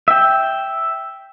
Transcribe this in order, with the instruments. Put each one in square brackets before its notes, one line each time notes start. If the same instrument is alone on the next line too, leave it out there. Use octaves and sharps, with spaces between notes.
[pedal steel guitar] E5 G5